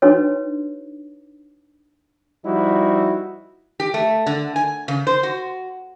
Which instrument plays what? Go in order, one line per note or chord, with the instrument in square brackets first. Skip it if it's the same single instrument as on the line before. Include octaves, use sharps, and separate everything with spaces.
[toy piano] D4 D#4 F#4 B4 C#5
[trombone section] F3 G3 D#4 E4 F#4
[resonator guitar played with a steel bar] G4
A3
D3
G#5
C#3
C5
F#4